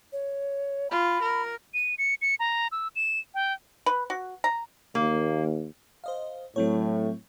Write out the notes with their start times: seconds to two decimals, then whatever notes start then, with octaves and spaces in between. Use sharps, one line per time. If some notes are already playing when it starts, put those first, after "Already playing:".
0.13 C#5
0.91 F4 B5
1.22 A#4
1.74 D#7
1.98 C#7
2.22 C#7
2.40 A#5
2.72 E6
2.96 E7
3.34 G5
3.86 B4
4.10 F#4
4.44 A#5
4.95 D#2 A#3
6.04 C5 D#5 F5
6.56 A2 F#3 C4 C#5